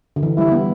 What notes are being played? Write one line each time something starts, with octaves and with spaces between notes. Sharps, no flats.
D3
E3
G3 E4
B3